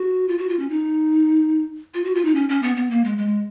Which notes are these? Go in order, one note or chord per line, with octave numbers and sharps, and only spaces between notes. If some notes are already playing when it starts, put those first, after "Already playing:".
Already playing: F#4
F4
F#4
F4
C#4
D#4
F4
F#4
F4
D#4
C#4
C#4
B3
B3
A#3
G#3
G#3